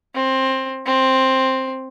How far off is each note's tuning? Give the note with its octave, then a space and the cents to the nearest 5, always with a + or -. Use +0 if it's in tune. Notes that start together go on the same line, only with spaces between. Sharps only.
C4 +15
C4 +10